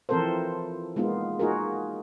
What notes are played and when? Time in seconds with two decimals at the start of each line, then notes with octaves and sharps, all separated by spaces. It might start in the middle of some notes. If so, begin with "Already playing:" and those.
0.09 E3 F3 C4 A4 A#4 C5
0.96 G#3 A#3 B3 D#4 F4
1.39 A#3 D#4 F4 F#4 G#4 A#4